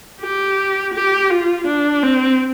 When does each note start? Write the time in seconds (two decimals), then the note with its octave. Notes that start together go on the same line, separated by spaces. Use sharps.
0.21 G4
0.94 G4
1.30 F4
1.67 D4
2.03 C4